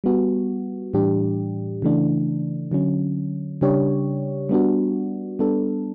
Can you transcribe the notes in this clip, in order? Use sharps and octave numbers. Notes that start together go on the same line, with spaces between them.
G3 B3 F#4
A2 E3 G3 D4 G4
C#3 E3 A3 D4
D3 F#3 C#4
C#3 G3 D4 G4 C#5
G3 B3 D4 F#4
G3 B3 D4 A4